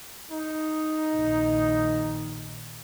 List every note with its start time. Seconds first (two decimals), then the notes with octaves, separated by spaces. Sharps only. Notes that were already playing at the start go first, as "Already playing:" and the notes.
0.31 D#4
1.16 A#1 D#3